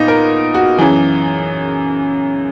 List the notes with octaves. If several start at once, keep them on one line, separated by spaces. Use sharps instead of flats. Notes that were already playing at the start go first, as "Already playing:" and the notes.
Already playing: A#2 B3 D#4
A#4
F#4
F#2 E3 G#4